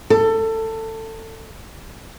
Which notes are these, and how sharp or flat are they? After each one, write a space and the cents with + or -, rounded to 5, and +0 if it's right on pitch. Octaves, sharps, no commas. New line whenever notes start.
A4 +20